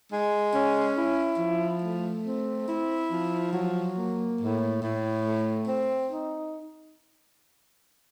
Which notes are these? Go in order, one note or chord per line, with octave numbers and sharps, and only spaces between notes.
G#3
C#4
E4
F3
A3
C4
E4
F3
F#3
A#3
A2
A2
A3
C4
D#4